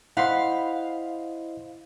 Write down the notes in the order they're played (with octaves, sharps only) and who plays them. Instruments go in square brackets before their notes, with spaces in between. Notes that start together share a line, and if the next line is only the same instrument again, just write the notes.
[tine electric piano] E4 C5 D#5 [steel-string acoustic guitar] F5 [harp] F#5 B5 C6